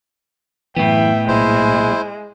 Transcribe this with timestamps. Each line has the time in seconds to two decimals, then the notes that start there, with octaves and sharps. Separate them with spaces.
0.77 F#2 A2 E3 B3 E5 G5
1.28 B1 A#2 G#3 E4 C5